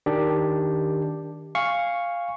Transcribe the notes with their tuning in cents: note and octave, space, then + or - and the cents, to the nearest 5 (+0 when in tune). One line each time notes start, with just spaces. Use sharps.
D#3 +0 D4 +0 G4 +5
F5 +0 G#5 -25 C#6 +0